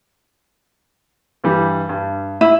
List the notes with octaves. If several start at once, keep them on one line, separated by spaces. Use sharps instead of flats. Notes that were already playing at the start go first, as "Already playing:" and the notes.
G2 E3 G3
G2
E4